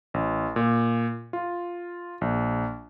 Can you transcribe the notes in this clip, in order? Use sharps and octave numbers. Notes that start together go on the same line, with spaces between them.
A1
A#2
F4
A#1